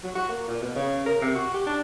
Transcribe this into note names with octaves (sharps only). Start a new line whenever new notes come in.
F#3
F#4
A#3
A#2
B2
C#3
A#4
C3
F#4
G4
D4